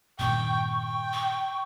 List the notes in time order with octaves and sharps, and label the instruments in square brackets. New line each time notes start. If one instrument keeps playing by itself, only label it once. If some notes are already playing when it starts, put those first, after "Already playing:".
[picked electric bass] G2 A#2 D#3 [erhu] G5 [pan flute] C#6
[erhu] G5
[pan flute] C#6